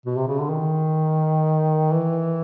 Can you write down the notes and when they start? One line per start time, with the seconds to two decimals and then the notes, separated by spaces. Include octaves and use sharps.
0.06 B2
0.17 C3
0.27 C#3
0.40 D3
0.49 D#3
1.92 E3